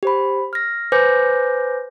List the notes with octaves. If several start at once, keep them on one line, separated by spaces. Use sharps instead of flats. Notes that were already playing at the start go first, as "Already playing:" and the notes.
G4 C5 B5
F6 A#6
B4 C5 G#5 D6 G6 A#6